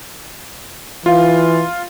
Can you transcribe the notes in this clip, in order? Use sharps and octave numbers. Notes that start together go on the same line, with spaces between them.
E3 F4 F5